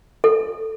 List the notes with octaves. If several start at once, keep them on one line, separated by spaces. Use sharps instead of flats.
A4